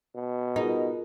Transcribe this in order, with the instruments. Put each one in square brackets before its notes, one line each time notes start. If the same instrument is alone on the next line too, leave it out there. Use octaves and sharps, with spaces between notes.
[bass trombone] B2
[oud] D#4 [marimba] F4 G#4 A#4